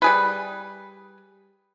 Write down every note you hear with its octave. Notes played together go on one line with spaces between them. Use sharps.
G3 G#4 B4